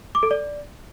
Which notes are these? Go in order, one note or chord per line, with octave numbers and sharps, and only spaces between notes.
D6
A4
D5